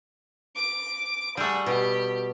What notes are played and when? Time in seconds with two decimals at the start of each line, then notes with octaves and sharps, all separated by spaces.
0.56 D6
1.37 G3 A3 G#4 F#5
1.66 B2 G4